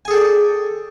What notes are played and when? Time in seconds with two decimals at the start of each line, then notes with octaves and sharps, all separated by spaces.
0.05 G#5
0.08 G#4
0.11 A4
0.13 G5
0.16 D5